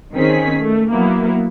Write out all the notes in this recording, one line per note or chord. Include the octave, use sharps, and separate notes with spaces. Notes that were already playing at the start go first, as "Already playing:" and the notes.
D#3 C4 C#4 G#4 B6
A3
F#3 A#3 B3 E4